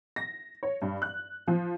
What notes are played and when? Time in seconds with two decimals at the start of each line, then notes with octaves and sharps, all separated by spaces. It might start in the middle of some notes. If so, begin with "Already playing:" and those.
0.16 A#6
0.63 C#5
0.82 G2
1.02 F#6
1.48 F3